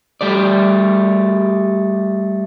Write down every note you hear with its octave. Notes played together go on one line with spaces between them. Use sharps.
G3 A3 D5